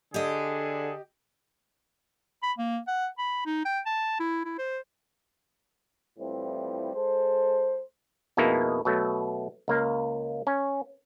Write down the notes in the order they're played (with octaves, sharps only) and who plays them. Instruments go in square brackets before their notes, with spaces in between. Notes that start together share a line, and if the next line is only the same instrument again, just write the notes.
[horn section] D3 G#4 [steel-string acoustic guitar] G4 D#5
[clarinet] B5
A#3
F#5
B5
D#4
G5
A5
E4
E4
C5
[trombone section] A2 E3 F3 G3 C4
G#3 A4 C5
[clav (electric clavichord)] F2 B2 G#3 A#3 D#4 E4
B2 F#3 A3
C#2 A#3 F5
C#4